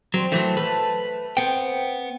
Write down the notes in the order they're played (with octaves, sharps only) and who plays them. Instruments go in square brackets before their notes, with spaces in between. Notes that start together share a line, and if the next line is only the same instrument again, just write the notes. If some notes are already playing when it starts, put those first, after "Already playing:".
[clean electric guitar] F#3 [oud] C4
[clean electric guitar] D3 E3 F#3 [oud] A3
[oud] A3 [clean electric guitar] B4
[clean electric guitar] B3 G5 [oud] C4